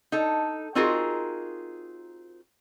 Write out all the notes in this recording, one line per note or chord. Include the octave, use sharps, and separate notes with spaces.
D#4 A4
C4 D#4 F4 F#4 G#4 A#4